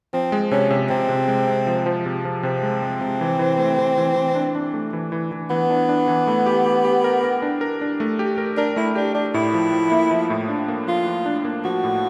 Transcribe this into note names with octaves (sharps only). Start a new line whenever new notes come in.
F3 C4
G#3
C3 C#4
C3
C3 C4
C3
G#3
C3
F3
F3
C3
F3
C3 C4
G#3
G#3
C3
E3
E3
A3
E3
E3
E3
D4
D4
A3
E3
E3
E3
E3 B3
D4
D4
E3
A3
G4
G4
G4
A#4
A#4
D4
A#4
D4
A3
G4
A#4
D4 A#4
A3 E4
D4 G4
D4 G4
A2 E4
F3
F3
A#3
F3
A2
D4
A#3
F3 F4
F3
D4
A#3
F3 F#4
A2